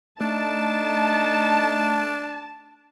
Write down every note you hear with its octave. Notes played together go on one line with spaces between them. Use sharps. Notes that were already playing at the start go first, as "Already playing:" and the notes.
A3 D4 D#4 A5